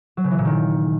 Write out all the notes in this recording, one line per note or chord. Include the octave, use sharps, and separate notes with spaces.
F#3
C#3
E3
A#2
D#3